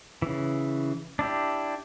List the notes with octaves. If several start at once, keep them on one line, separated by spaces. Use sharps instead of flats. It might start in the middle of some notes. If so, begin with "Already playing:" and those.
C#3 E3
D4 E4 G4